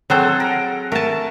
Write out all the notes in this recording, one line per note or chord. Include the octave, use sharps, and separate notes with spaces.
F#3 C4 G#4 A4 C5 F#5
A#4
A3 A#4 A5